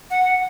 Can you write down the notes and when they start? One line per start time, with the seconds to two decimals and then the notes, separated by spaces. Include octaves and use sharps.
0.10 F#5